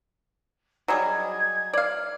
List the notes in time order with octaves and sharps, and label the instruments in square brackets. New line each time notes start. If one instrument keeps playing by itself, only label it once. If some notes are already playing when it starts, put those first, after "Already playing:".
[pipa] F#3 G3 G#4 [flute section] D#5 G#6
[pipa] D5 F5